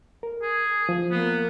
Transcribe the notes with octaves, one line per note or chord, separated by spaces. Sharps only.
A#4
G#4
F3
A#3 B3